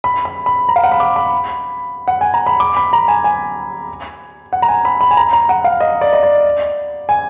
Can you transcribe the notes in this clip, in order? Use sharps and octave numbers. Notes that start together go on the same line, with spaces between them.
B5
B5
B5
A#5
F5
F#5
B5
D6
B5
F#5
G#5
A#5
B5
D6
B5
A#5
G#5
G#5
F#5
A#5
G#5
B5
B5
G#5
A#5
A#5
F#5
F5
D#5
D5
D#5
D5
G#5